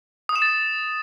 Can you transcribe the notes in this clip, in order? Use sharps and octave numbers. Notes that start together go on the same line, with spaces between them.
D#6
E7
A6